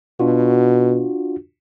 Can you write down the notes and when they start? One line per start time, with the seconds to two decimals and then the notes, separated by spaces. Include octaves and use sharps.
0.20 B2 D4 F4 F#4